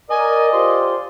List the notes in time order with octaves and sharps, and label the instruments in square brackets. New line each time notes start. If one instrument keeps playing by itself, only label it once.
[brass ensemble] A#4 [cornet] D5 [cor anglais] D#5 [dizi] G#5
[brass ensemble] F4 G4 C5 [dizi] C6